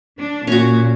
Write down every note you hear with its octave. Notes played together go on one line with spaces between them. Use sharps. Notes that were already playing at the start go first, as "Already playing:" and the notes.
D4
A#2 C#4 F#4